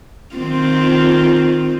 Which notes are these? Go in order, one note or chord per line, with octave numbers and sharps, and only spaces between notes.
D#3 C4 F4